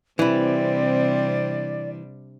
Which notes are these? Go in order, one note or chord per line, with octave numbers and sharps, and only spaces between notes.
C3 E3 G3 C4 D4 E4 D5